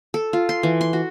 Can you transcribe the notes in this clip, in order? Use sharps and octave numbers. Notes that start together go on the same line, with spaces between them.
A4
F4
C6
E3
C6
F#4